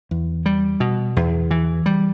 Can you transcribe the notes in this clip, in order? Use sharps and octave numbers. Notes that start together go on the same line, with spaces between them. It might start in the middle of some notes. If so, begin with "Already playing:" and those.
E2
G3
B2
E2
E3
G3